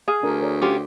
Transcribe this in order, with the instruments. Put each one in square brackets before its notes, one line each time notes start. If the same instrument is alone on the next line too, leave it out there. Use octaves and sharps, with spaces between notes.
[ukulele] G#4 [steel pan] F5
[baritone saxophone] D2 [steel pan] D4 A#4
[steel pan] A#4 C#5 D5
[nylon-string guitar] C#4 F4 G4 [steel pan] F#5 C6 D6